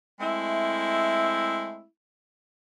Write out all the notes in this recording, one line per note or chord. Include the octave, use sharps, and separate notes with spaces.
G#3 A3 C4 E4